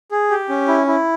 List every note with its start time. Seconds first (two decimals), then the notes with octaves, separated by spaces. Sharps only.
0.11 G#4
0.30 G4
0.49 C#4
0.68 E4
0.87 E4